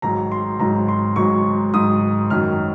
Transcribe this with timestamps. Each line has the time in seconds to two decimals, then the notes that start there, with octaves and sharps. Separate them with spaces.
0.02 G#1 G#2 F#3 A#5
0.32 C6
0.59 G#1 G#2 F#3 A#5
0.88 C6
1.16 G#1 G#2 F#3 C#6
1.74 G#1 G#2 F#3 D#6
2.30 G#1 F#2 D#3 F#3 F6